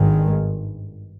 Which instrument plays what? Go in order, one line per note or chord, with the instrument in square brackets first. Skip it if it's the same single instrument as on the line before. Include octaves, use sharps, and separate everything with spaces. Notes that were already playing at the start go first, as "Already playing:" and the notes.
Already playing: [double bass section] G#1 G2 D#3 G#3